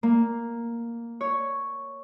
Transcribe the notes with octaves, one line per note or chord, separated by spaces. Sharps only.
A#3
C#5